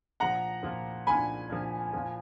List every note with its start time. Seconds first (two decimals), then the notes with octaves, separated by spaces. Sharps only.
0.20 A#2 F3 F#5 A#5
0.63 A#2 F3
1.07 A#2 F3 G#5 B5
1.50 A#2 F3
1.93 A#2 F3